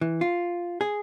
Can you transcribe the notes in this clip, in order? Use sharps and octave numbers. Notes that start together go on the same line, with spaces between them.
E3
F4
G#4